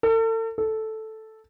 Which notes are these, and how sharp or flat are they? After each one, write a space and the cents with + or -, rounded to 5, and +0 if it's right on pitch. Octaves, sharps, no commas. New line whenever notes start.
A4 +40
A4 -5